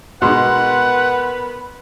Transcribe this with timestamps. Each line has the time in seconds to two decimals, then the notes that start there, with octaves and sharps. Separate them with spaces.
0.22 B2 G#3 B3 D#4 A#4 B4 F#5 C6